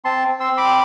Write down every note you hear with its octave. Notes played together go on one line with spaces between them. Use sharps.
C4 A5 C6
C4
C6 E6
C4
B5 D6